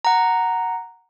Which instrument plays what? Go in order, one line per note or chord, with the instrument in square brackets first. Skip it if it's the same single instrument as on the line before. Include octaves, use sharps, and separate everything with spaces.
[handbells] F#5 A#5